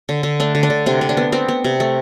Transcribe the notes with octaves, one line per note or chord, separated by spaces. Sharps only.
D3
D3
A3 D4
D3
D4
D3
C3 D4
C3
D4
B3
B3 C4
B3
C3
A3